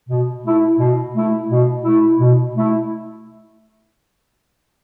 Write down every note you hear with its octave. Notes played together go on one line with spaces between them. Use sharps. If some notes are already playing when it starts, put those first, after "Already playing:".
B2
A3 E4
B2
A3 E4
B2
A3 E4
B2
A3 E4